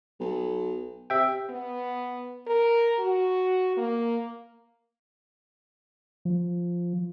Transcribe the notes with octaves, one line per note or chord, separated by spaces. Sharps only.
B1
C3 E5 G5
B3
A#4
F#4
A#3
F3